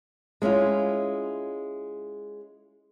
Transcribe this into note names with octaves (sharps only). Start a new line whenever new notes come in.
G#3 C#4 E4 F4